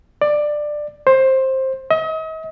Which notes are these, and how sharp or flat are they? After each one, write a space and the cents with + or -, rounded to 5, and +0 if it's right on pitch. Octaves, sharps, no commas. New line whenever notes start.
D5 +15
C5 +15
D#5 +40